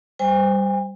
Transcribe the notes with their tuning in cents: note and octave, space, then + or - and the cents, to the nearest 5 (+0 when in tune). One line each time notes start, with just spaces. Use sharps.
G3 +0 C5 -15 G#5 -45